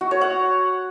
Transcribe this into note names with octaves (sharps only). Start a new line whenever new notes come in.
F#4
C#5
F#5